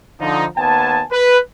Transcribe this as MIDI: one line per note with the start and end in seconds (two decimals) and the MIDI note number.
0.20 0.45 50
0.20 0.45 53
0.20 0.45 63
0.57 1.02 39
0.57 1.02 59
0.57 1.02 80
0.57 1.02 81
1.12 1.38 71